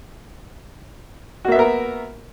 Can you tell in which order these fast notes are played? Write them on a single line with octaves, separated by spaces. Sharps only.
F#4 A#3 E5 B3 A#4